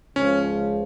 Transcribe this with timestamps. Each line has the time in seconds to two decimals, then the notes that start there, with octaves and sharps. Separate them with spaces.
0.16 C#2 C#3 F3 C#4